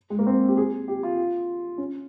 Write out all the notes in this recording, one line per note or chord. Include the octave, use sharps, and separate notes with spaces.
G#3
A#3
C4
G4
G#4
G4
F4
C#4